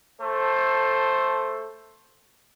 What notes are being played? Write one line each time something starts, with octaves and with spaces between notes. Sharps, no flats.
A3 A4 C5